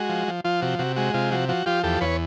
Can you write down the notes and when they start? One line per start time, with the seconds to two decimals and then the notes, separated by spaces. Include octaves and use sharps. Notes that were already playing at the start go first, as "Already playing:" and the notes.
Already playing: G#3 F#4
0.09 F3
0.28 F3
0.44 F3 F4
0.62 C3 F#4
0.79 C3 F#4
0.96 G#3 F#4
1.14 C3 F4
1.31 F3 F#4
1.49 F3 F#4
1.66 F3 F4 G4
1.83 E2 G4 A4
2.01 E2 B4 C#5